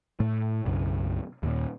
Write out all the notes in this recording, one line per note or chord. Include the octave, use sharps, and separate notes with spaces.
A2 A3
B1 F#2 C#3
D#2 A#2